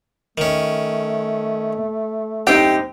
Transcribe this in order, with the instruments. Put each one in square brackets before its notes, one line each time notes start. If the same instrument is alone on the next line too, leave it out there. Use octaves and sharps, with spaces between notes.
[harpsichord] D#3 C#4 [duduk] A3
[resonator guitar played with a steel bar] F#2 C4 D#4 [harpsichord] G4 [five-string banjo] G5